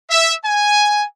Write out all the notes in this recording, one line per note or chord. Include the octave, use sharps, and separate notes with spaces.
E5
G#5